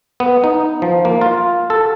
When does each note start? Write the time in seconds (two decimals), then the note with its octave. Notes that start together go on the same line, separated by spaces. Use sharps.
0.20 B3
0.44 D#4
0.82 F3
1.05 A#3
1.21 F4
1.70 A4